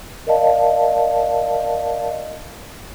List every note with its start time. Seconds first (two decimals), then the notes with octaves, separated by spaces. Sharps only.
0.27 A#4 D5 D#5 F5 A5